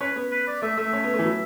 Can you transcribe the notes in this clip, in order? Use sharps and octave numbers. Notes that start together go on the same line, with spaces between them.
C#4 B4
B3
B4
D5
A3 E5
A3 E5
C#4
B3
A3
E3
F#3